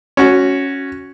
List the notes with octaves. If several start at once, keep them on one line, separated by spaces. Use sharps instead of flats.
C#4 F#4